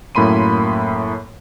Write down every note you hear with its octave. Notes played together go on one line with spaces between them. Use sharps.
F#2 A2 A#3 B5 C6 D#7